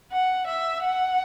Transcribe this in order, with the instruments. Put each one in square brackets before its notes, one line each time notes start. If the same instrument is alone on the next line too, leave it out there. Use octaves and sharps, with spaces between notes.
[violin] F#5
E5
F#5